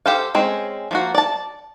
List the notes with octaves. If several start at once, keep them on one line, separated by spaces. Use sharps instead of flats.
G4 A4 C5 F5
G#3 C4 C#4
F3 A#3 F#4
D5 A5